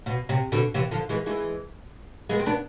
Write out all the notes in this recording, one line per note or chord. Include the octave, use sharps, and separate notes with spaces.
B2
C3
B2 D3
C3 E3
D3 F3
E3 G#3
E3 G#3
G#3 B3
C4
B3 D4